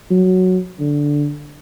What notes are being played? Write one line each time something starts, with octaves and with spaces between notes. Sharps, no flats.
F#3
D3